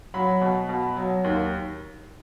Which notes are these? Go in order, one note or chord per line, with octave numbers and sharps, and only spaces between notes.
F#3 B5
B2
B2
F#3
D#2